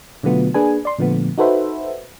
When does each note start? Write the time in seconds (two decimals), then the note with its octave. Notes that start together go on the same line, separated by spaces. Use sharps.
0.23 B2 D3 F#3 A3 B3 F4
0.54 A#3 D4 G#4 B4 G#5
0.85 D5 C6
0.98 A#2 D3 F3 A3 B3
1.38 D#4 F#4 A4 B4 C5 E5